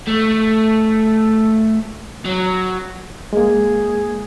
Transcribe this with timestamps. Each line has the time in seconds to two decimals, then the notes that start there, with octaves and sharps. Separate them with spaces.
0.07 A3
2.25 F#3
3.33 G#3 A#3 G#4